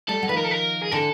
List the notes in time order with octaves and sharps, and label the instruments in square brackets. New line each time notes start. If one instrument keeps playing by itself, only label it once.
[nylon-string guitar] G3 A3 [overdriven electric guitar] A4
[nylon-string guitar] F#3
[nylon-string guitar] D#3 F3 [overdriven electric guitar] B4
[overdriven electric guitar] A#4
A4
A#4
G#4
[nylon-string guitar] D3 E3 [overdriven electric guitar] A4